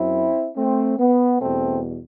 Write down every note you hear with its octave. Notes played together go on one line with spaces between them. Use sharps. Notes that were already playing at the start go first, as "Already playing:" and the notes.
Already playing: F#2 F#3 C4 E4
A3 C4
B3
E2 B2 G3 A3 C4